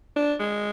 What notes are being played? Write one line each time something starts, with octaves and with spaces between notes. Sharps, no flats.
D4
G#3